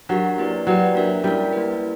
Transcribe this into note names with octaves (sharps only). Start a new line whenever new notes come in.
F#3 D4 G4 A#4
A#3 E4 G4 B4 D5
F#3 G4 B4 D5 G5
A#3 D4 A#4 E5
G3 C#4 E4 A#4
A#3 E4 B4